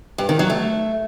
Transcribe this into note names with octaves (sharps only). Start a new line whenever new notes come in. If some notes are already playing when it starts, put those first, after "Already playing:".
G2
D#3
F#3
A3